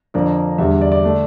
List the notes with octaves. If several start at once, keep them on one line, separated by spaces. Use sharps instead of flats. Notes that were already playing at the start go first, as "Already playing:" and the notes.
F2 D3 F3 A#3 D5
E2 D3 G3 E5
D5
D5
D3 A3 D4